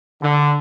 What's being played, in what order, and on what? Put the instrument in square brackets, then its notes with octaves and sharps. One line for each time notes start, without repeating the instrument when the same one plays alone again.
[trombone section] D3